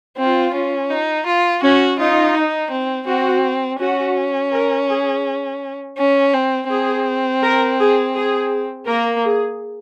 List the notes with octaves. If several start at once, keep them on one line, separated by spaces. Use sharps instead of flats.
C4 F4
C#4
D#4
F4
C#4 F#4
D#4 F4
D#4
C4
C4 F#4
C#4 F#4
A#4
G#4
C#4
C4
C4 G#4
A#4
G#4
G#4
A#3 A#4
G#4